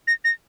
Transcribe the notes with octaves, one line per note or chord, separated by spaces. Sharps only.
A#6
A#6